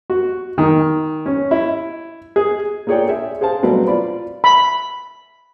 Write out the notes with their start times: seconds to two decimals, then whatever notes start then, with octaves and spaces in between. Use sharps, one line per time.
0.10 F#4
0.58 D#3
1.26 C#4
1.51 E4
2.36 G#4
2.87 A#3 F4 G#4 C#5 D5 G5
3.08 G#4 E5
3.41 G#4 C5 F5 A5
3.63 B2 F#3 G3 A3 C4 B4
3.88 F4 D5 B5
4.44 B5